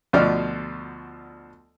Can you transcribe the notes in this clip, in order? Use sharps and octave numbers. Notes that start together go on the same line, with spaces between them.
D2 B2 F3 D5 F6